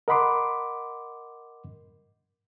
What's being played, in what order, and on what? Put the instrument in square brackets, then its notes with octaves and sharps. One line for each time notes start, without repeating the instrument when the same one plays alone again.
[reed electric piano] A#4 D#5 F#5 B5 C6 D6